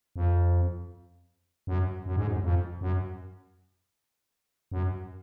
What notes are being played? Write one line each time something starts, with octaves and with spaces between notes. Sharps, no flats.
F2
F#2
F#2
G#2
F#2
F2
F#2
F#2